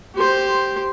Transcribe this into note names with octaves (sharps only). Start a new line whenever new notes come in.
G4 C5